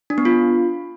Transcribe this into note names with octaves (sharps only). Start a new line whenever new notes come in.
D4
B3
F4